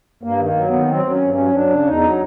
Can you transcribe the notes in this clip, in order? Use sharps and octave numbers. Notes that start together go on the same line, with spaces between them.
G2 A#3
D#3
A#3
F#3
B3
D#3
F#3 C4
F#3
C#4
G2
C#4
F#3
F#3 D4
C#3
E2 D#4
F#3